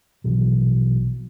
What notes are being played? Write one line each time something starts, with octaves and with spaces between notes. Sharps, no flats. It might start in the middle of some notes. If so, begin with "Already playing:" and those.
A#1 B2 E3 F#3